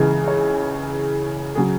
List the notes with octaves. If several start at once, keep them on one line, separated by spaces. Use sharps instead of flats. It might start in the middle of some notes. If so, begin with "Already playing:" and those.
Already playing: C#2 C#3 E3
C#5
C#3 F#3 G#4